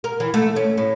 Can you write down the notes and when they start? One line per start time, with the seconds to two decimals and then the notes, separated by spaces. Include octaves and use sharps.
0.04 A#4
0.20 E3
0.34 A3
0.56 C#4
0.78 A2